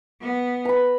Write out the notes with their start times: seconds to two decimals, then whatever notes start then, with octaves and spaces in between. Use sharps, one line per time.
0.21 B3
0.65 B4 A#5 B5